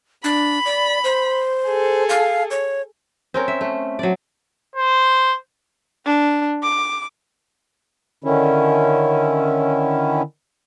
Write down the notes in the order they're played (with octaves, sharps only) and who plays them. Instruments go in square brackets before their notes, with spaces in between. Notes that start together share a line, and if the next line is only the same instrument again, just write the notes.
[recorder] D4 [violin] B5
[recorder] D5
C5
[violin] G#4 A4
[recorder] F5
C#5
[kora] C4 C#4 A#4
E5
A3
F#3 D5
[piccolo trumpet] C5
[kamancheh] D4
D6
[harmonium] D3 D#3 C#4 E4